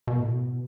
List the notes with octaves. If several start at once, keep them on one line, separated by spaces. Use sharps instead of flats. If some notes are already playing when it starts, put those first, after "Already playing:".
B2
A2
B2